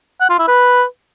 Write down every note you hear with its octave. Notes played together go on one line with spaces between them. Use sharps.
F#5
F4
E4
B4